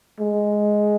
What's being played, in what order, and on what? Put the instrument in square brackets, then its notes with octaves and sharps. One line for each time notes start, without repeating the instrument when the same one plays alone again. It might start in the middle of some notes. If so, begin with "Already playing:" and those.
[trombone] G#3